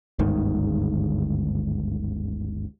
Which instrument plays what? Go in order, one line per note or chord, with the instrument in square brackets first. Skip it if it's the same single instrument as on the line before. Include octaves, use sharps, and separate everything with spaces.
[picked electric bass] G1 D2 G#2 D#3